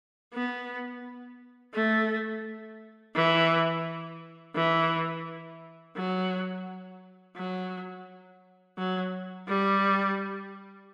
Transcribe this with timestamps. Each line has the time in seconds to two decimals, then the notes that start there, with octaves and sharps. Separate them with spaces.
0.34 B3
1.74 A3
3.15 E3
4.55 E3
5.96 F#3
7.37 F#3
8.78 F#3
9.48 G3